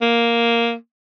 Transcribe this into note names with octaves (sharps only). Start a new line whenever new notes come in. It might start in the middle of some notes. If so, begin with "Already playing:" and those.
A#3